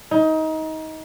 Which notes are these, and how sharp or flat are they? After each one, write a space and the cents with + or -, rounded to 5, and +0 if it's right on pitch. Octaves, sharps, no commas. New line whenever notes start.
D#4 +25